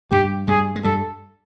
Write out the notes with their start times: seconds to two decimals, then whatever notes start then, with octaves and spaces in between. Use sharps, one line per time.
0.11 G2 G3 G4
0.48 G2 G3 G#4
0.76 G#3
0.84 G2 G3 A4